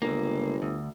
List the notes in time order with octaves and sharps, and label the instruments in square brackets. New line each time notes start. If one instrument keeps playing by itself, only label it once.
[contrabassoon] G1 [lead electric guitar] C#2 A#3
[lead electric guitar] D2